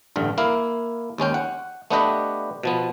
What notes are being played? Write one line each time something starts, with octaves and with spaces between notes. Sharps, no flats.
A1 G2 D3
A#3 E4 F5
D#2 G#3 C#4 G5
F#5
A3 B3 D4 G4 B4 D#5
B2 F3 B3